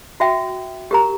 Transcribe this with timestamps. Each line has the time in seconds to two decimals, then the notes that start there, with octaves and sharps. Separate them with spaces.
0.20 F#4 E5 G5
0.91 G4 A#4 A#5